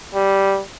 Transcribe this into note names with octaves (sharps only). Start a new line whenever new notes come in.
G3